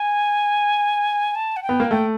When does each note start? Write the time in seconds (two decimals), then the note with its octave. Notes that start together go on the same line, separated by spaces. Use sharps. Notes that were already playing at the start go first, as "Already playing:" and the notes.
Already playing: G#5
1.35 A5
1.56 F#5
1.63 G5
1.69 B3
1.80 A#3
1.91 A3 G5